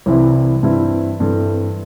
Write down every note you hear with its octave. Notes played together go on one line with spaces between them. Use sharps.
C2 C3 E3 C4 E4
G2 E3 C4 E4
G2 E3 C4 A4